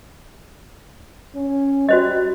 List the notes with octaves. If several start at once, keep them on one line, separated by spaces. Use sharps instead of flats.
C#4
G3 F#4 C5 D#5